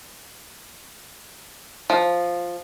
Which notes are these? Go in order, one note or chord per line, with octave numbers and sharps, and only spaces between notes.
F3